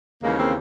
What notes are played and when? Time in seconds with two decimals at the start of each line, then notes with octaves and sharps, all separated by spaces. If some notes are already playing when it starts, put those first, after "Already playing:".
0.22 D#2 C#3 E3 G#3 A#3
0.38 A#3 C4